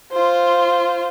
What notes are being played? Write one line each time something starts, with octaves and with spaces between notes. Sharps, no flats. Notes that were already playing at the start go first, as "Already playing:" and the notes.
F4 C5